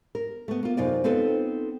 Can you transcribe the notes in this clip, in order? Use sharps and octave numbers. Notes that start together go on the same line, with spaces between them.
A#4
A3 B3
A#3 F4
F#2 C3 D#4 F4 D5
B3 C4 D#4 F4 A4 B4